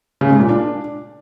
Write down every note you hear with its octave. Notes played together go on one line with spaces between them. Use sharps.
C#3
G#2
A#2
D4